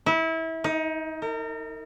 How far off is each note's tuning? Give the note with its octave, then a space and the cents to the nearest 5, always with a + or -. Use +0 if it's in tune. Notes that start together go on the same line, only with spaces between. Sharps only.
E4 -25
D#4 +25
A#4 -35